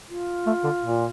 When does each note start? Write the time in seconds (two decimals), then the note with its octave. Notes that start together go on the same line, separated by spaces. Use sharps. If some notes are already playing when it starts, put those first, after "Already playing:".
0.09 F4
0.46 A3
0.64 D3
0.83 A#2